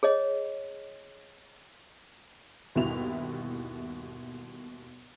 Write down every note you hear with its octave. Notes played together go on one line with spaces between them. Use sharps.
G#4 C#5 D#5
G1 D#2 B2 E4 E5 F7